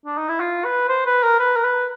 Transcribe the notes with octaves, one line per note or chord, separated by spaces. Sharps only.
D4
D#4
E4
F4
B4
C5
B4
A#4
B4
A#4
B4